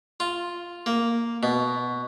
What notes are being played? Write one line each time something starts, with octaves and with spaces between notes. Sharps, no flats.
F4
A#3
B2